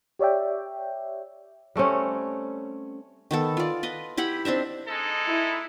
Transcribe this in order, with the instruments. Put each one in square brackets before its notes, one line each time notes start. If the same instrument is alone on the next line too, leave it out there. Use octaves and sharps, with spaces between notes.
[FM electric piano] G4 C#5 D5 E5 G5
[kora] G3 A3 C4 C#4
[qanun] D#3 B3 A4
F4 D5
B4 D#5
E4 G4 F#5 B5
C4 D4 D#4 E5
[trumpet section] G#3 D#4 A4
[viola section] E4